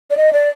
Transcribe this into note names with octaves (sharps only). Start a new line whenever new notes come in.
D5
D#5
D5